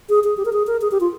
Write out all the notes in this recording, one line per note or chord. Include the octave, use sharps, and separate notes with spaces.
G#4
G#4
G4
A#4
G#4
A#4
G#4
G4
F4